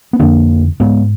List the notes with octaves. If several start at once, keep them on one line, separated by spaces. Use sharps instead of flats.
B3
F2 D3 A#3 D4
G#2 G#3 B3